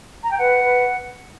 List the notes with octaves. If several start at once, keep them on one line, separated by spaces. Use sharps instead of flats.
A#5
G5
B4 F#5
B4